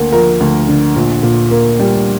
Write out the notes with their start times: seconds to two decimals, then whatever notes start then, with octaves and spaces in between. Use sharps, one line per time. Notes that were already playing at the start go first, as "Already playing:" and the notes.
Already playing: D2 D3 A#3
0.12 F3 A#4
0.40 D2
0.68 D3
0.96 A#1
1.23 A#2
1.51 A#3
1.80 G3